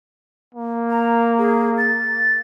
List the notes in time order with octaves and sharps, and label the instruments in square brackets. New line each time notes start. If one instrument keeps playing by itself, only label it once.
[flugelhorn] A#3
[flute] A#5
G#4
A6